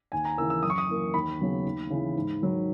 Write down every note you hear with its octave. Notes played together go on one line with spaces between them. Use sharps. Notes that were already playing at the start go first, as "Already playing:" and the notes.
D#2 G#5
A#5
C#3 E3 A#3 E6
E6
F#2 D#6
C#6
D#6
E3 A#3
D#2 B5
C#3 F#3 B3
D#2
C#3 E3
G#2
D#3 F#3